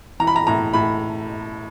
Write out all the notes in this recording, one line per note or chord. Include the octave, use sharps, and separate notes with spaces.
E3 A#5
B5
A#5
A2 A#5
A2 B5